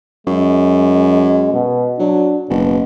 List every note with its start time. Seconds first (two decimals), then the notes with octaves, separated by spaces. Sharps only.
0.27 F#2 G#3
1.53 B2
1.99 F#3 D4
2.49 F#1 B2